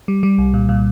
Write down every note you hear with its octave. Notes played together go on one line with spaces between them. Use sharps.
G3
G3
C2
A#2
A#2